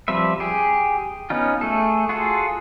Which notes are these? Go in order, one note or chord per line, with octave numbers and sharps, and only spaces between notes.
F3 G3 C4 B4 E5
G4 G#4
B3 C#4 D#4 F4
A3 G#4 A4
F4 F#4 G#4 A4